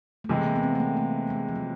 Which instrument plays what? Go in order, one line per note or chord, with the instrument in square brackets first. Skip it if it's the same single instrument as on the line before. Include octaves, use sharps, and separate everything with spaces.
[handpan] A3
[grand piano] C3 E3 G#3 [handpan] A#3
[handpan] A#3
B3
C4
A3
A#3
A3
G#3
F3
F#3